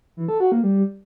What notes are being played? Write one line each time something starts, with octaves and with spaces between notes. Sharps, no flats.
E3
A4
F#4
A#3
G3